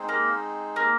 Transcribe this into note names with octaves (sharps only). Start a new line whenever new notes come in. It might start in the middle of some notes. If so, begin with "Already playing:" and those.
Already playing: G#3 C4 D#4 G#4 C5
A#3
A#3